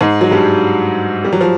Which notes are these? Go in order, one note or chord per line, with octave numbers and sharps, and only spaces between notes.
G#2 G#3
F#3
G2 G3
G3
F#3
F3